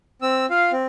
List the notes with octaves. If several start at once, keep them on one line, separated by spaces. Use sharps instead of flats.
C4 E6
F4 F5
C4